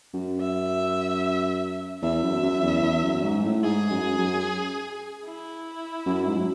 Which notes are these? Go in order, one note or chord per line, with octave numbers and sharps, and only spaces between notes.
F#2
E5
E2 E5
F#2
F#2
E2
E2
F#2
G#2
A2
G#2 G#4
F#2
F#2
E4
F#2
G#2
F#3